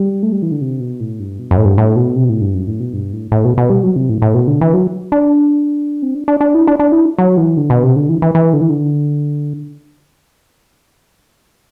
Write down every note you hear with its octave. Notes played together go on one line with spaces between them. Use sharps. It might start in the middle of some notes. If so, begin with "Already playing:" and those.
Already playing: G3
A3
G3
E3
D3
C3
B2
A2
G2
B2
F#2
A2
G2
A2
B2
C3
B2
A2
G2
F#2
A2
B2
G2
A2
A2
B2
B2
G3
F#3
C3
A2
A2
B2
D3
E3
F#3
D4
C4
D4
D4
D4
E4
D4
D4
E4
F#3
E3
D3
B2
C3
D3
E3
E3
E3
D3
E3
D3